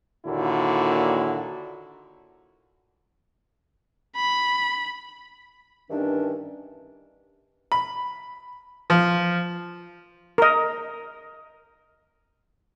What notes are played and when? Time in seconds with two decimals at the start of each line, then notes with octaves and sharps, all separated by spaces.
0.24 D#2 A#2 D3 E4 F#4
4.16 B5
5.90 G2 D#3 E3 C#4 D4
7.72 B5
8.90 F3
10.38 A#4 D#5